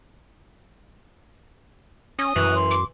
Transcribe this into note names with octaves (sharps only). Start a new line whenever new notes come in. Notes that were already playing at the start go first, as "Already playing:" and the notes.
C#4 D#6
F#2 E3 F#4
C6
D6